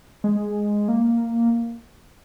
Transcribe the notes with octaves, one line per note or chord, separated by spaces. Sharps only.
G#3
A#3